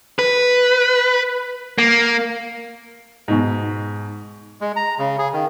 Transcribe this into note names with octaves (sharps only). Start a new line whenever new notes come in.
B4
A#3
G#2 B2
G#3
A#5
C#3
G#4
D#3